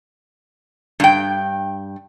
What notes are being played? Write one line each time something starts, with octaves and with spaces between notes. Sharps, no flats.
G2 G5